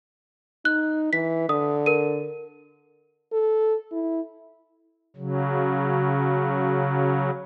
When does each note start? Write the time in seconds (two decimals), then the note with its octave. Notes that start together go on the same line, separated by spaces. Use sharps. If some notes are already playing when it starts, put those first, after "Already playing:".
0.65 D#4 F#6
1.13 E3 B6
1.49 D3 D#6
1.86 A#4 D#7
3.32 A4
3.92 E4
5.17 C#3 F#3